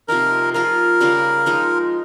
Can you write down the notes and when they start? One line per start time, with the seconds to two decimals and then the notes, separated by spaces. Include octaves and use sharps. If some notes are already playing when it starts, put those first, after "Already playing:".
0.08 C3 F3 A#3 D#4 A#4
0.54 F3 A#3 F4 G#4 A#4
1.01 C#3 G3 A#3 F4
1.46 F3 G#3 D#4